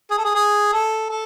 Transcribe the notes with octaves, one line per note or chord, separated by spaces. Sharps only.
G#4
A4
G#4
G#4
A4
A4